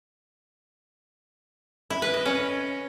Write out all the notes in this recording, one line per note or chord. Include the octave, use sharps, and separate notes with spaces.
E4
B4
D#5
C#4